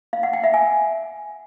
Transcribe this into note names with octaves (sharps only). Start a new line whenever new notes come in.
F5
F#5
G5
E5
G#5